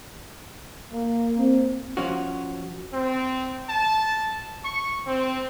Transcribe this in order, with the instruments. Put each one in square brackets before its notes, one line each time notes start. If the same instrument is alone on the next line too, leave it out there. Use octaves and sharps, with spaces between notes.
[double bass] A#3
[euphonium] C4
[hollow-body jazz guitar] F3 C#4 F#4
[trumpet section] C4
A5
C#6
C4